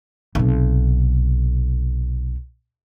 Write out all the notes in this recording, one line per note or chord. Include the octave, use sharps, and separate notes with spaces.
B1 C3